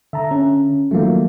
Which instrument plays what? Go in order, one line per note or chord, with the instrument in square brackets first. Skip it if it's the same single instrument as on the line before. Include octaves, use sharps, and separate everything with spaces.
[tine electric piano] D3 [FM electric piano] E5 A5 A#5
[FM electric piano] C#4
[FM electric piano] D#3 F3 F#3 [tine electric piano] A3 A#3